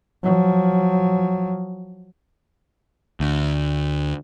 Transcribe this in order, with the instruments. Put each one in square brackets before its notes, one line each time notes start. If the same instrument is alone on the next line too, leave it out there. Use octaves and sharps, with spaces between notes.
[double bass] F3 F#3
[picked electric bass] D2